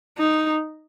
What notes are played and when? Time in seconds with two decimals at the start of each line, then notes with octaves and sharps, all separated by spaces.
0.18 D#4